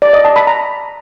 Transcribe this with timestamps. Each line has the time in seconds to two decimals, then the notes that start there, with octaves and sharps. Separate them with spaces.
0.02 D5
0.13 D#5
0.25 A5
0.36 B5
0.47 A#5